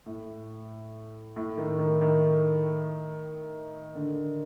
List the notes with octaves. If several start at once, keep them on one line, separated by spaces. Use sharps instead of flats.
A2
A2
D#3
D#3
D#3
D3